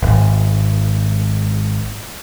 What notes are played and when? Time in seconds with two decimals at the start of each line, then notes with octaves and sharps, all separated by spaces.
0.03 D1 G#1